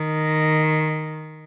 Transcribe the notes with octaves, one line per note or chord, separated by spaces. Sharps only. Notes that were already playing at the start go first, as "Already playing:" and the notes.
Already playing: D#3